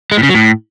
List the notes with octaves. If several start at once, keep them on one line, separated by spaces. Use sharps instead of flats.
G#3
A2
C#3
F#3
A2